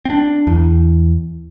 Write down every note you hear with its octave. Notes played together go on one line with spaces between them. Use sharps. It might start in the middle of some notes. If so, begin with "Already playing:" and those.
C4 D4
E2